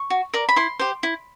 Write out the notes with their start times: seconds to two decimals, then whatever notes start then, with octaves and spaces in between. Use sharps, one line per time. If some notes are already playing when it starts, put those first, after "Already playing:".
Already playing: C#6
0.10 F#4
0.34 A#4 D5
0.49 B5
0.56 E4 C6
0.79 G4 C5
1.03 E4